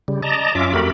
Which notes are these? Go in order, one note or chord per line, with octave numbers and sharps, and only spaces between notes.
C#3 G3
D5 D#5 A5 A#5
F#2 C#4 F4 E5 D6
F2 A3 F#4 G4 A#4 B5